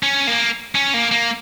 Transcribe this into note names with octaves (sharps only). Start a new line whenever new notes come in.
C#4
A#3
C#4
A#3
A#3